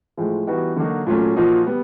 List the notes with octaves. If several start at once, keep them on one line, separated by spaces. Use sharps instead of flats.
A2 F3 G#3
E3 G3 B3 D#4 F#4
D3 F#3 A#3 D#4 F#4
A#2 F#3 A3 C#4
A#2 F3 A#3 D#4 F#4
G3 B3